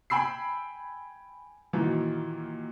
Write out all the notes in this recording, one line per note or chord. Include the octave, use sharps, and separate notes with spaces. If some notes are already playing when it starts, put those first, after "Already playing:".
G5 G#5 B5 E6 C7
A#2 D#3 E3 F#3